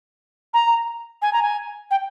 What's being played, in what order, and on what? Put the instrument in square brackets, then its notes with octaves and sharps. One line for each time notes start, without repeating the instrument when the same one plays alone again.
[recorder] A#5
G#5
A#5
G#5
G5